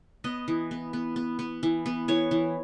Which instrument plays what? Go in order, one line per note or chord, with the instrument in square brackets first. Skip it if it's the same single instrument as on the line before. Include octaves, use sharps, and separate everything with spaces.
[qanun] B3 D#5
E3
B3
B3
B3
B3
E3
B3
E3 C#5
E3